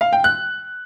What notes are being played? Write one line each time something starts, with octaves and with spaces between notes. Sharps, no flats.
F5
G5
F#6